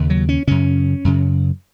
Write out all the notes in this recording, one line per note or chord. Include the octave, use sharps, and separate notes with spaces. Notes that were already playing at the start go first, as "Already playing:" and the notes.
Already playing: D#2 C#3
F#3
C#4
F#2 C#3 C#4
F#2 C#3